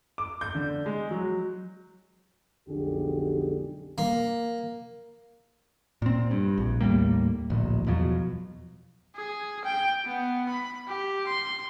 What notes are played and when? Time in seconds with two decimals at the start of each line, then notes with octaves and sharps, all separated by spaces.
0.18 D6
0.41 G6
0.55 D3
0.86 G#3
1.11 F#3
2.69 B1 F2 D3 G#3 G4 G#4
3.98 A#3
6.02 A#2 C4
6.31 G2
6.57 A#1
6.81 D#2 A2 G3 A#3
7.50 D1 A#1
7.86 E2 B2 F3 F#3
9.16 G#4
9.65 G5
10.05 B3
10.49 B5
10.87 G4
11.27 C6